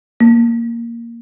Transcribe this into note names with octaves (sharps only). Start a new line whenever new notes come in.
A#3